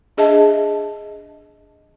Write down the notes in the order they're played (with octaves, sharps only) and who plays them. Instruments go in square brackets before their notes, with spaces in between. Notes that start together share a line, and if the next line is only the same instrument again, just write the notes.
[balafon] D4 G#4 D#5 E5 A5